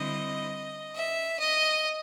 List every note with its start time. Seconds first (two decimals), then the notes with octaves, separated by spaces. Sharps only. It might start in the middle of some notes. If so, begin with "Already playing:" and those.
Already playing: D3 G3 C4 E4 D#5
0.94 E5
1.39 D#5